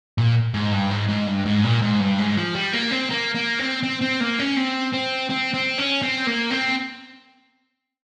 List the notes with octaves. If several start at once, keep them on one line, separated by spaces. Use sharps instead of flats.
A#2
G#2
G2
G#2
G#2
G2
G#2
A#2
G#2
G2
G#2
F3
G3
A#3
C4
A#3
A#3
C4
C4
C4
A#3
C#4
C4
C4
C4
C4
C#4
C4
A#3
C4